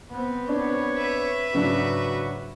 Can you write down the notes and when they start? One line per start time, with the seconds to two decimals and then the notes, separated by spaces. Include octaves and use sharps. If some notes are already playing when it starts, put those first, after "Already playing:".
0.11 B3 C4
0.49 D4 C#5
0.95 B4 E5
1.55 G#2 C#3 F#3 D4 F#4